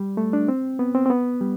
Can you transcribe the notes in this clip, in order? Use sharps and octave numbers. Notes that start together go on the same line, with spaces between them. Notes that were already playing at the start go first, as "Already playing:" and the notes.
Already playing: G3
A3
D4
C4
B3
C4
C4
B3
G3